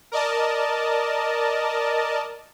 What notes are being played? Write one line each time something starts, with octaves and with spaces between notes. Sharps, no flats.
A#4 D5 D#5 A5